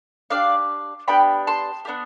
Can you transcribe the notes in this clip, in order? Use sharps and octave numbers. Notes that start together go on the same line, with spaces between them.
D4 G4 D5 F5
B3 D4 G4 G5 B5
A5 C6
B3 D4 G4